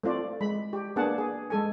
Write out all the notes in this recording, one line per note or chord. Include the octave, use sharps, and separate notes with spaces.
A3 C4 F4 D5
G#3 B5
G4
A#3 B3 D4 G#4 F#5 A5
G#4
G#3 A4 G#5